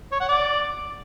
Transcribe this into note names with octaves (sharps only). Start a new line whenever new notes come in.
C#5
F#5
D5